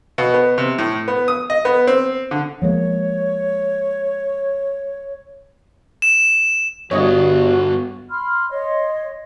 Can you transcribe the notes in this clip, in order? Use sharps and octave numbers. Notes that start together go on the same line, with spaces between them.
B2
B3
C3
A2
B3
D#6
D#5
B3
C4
D3
F3 G#3 A#3 C#5
E7
G1 G2 B3 F#4 C#5 D#5
B5 C6 F6
C#5 D#5 C6